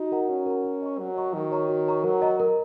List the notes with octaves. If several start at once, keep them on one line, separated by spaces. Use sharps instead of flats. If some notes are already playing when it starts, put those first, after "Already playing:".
Already playing: D#4 F#4
A#4 F#5 A#5
C#4 F#4
A#4 F#5 A#5
A#4
D#5 A#5 C#6
F#3 A#4
D#5 A#5 C#6
D#3 F#4
C#5 A#5 C#6
F#4
C#5 A#5 C#6
F#3 A#4
D#5 A#5
A#4